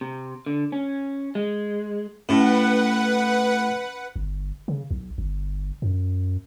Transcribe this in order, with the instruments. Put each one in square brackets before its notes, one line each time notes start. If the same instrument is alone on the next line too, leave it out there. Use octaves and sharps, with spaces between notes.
[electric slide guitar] C3
D3
C#4
G#3
[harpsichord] A2 [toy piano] C#4 G4 A5 [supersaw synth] B4 F#5
[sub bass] G1
C#3
B1
G1
F#2